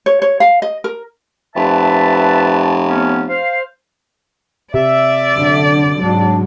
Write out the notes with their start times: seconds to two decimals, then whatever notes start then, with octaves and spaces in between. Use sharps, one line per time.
0.06 C#5
0.22 C#5
0.40 F5
0.62 D#5
0.84 A#4
1.56 F1 B4 E5 A5
2.88 B3 C#4
3.29 C5 F5
4.74 C3 D5 E5
5.33 F#2 D3
6.01 G#2 F#3 G#3 D4